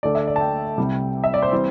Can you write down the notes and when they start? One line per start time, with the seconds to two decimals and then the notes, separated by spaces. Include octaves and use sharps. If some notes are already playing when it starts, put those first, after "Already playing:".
0.03 D2 D3 A3 D4 D5
0.15 E5
0.27 D5
0.36 A5
0.40 G5
0.78 C2 C3 G3
1.24 E5
1.34 D5
1.42 C5
1.51 E3 G3 C4